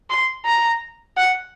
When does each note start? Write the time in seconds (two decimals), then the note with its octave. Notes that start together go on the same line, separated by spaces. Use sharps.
0.10 C6
0.46 A#5
1.17 F#5